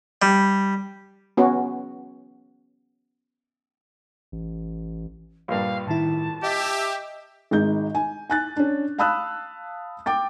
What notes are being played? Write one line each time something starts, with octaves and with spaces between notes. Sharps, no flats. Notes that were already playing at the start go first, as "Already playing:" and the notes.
G3
B3 C#4 F#4
A1
A#1 G2 F5
A2 D#3 E4 A5
G4 D#5 E5
G#1 G#3 D#4 G6
G#5
G#5 F#6 A6
C#4 D4
F5 A5 B5 D#6 E6 F#6
G5 D6 A6